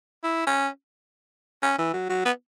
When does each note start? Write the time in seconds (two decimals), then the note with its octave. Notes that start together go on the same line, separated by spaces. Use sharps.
0.24 E4
0.47 C#4
1.63 C#4
1.78 E3
1.93 F#3
2.09 F#3
2.25 B3